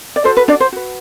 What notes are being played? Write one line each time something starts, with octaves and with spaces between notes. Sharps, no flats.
D5
F#4 A4 C5
B4
D4 D5
C5
F#4 B4